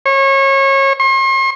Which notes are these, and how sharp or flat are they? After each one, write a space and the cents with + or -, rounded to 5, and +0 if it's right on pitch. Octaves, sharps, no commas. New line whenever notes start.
C#5 -30
C6 +45